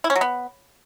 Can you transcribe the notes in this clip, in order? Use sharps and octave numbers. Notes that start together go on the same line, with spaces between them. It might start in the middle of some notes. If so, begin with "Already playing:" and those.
E4
C#4
F#3
B3